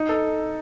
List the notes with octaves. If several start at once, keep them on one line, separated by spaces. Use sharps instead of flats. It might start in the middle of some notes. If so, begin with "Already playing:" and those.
Already playing: D#4
A4